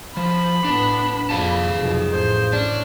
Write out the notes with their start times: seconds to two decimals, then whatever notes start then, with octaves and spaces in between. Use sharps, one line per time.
0.17 F3 B5
0.65 A2 B3 D4
1.30 F2 G#4 F5 A5
1.74 B1 F2
2.12 A1 C5
2.53 A2 C#4 D4